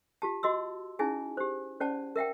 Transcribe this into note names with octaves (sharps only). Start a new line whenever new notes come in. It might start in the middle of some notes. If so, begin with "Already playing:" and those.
F4 G4 A5
F#4 D#5 C6 E6
C#4 D#4 E4 G#4 G#5
G4 C5
C#4 C5 D5 F#5 A5
A#4 E5 F#5 G5